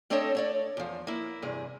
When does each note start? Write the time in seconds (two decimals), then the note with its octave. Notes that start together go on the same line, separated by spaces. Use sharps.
0.10 A3 C4 D4 A4 C#5 D#5
0.35 A3 C#5 D5
0.77 E2 F3
1.07 A#3 E4
1.42 E2 G2 C3 G#4